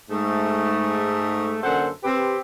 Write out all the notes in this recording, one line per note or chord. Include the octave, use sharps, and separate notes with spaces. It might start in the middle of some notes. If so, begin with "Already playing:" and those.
G#2 A3
F#2 D3 A#3 A4 C5 F#5
C4 G4 B4